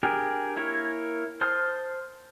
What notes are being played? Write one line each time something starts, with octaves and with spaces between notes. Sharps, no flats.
D4 G4 G#4 A#4
A#3 E4 A#4 C#5
C5 A5 C6 D#6 F6